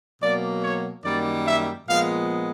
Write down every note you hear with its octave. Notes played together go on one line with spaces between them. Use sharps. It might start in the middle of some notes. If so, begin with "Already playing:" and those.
B2 F#3 A#3 D5
C#5
F#2 D#3 G3 A#3 D5
E5
A#2 F3 G#3 B3 F5